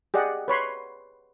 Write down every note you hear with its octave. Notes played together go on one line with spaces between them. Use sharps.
G4 G#4 D5 D#5 F#5
B4 C#5 B5 C6